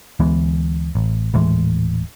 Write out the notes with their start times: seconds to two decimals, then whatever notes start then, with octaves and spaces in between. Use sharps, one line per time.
0.20 D2 E3 G#3 B3
0.95 A1
1.34 D#1 A2 E3 G#3